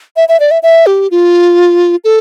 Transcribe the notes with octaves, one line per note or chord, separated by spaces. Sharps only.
E5
E5
D5
E5
E5
G4
F4
A4